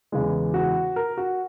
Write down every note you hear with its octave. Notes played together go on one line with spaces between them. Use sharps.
E2 C#3 E3 G#3
F#4
A#4
F#4